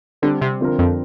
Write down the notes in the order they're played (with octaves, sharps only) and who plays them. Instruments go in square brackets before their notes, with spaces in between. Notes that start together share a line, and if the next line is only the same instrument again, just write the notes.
[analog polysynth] D3 [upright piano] G3 C4 G4
[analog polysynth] C3
[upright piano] D3 F3 C4 F4 A#4
[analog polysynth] F2